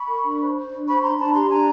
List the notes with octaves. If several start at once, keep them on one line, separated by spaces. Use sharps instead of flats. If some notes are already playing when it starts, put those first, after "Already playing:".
Already playing: B5 C#6
A#4
D4
C5
C5
D4
C5 B5 C#6
D4 A#5 C6
D4 A5 B5
G4 A#5 C6
D4 G#5 A#5